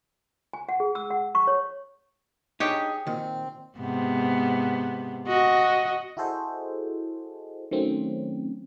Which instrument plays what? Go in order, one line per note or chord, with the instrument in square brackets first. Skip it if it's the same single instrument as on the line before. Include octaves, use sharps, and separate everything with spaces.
[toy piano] G#5
F#5
G#4
E6
F#5
C#6
C#5
[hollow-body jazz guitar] D4 D#4 [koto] G4 C#5 [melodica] G#4
[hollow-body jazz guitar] A#2 D#3 [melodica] C4
[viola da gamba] G#2 C3 B3
F#4 D#5
[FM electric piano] E4 F#4 G#4 A4 C5 D#5
D#3 F#3 A3 C4 C#4